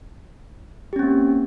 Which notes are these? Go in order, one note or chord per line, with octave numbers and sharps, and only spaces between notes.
A#3 C4 C#4 G4